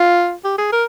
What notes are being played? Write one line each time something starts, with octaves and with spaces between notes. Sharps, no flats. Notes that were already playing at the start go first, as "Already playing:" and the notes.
Already playing: F4
G4
G#4
A#4